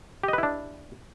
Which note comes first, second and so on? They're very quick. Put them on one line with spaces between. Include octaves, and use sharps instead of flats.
G4 D#5 B4 E4 D4